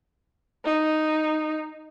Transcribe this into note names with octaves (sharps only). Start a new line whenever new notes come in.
D#4